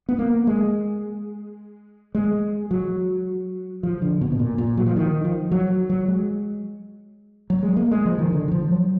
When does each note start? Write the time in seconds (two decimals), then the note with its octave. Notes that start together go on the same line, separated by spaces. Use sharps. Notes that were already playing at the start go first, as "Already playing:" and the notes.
0.09 B3
0.19 A#3
0.47 G#3
2.15 G#3
2.71 F#3
3.83 F3
4.02 D3
4.21 B2
4.32 B2
4.39 A#2
4.58 A#2
4.77 F#3
4.86 F3
4.96 D#3
5.24 F3
5.51 F#3
5.90 F#3
6.08 G#3
7.50 F#3
7.63 G#3
7.77 A#3
7.91 G#3
8.05 F3
8.18 D#3
8.32 D3
8.48 D#3
8.52 F3
8.71 F#3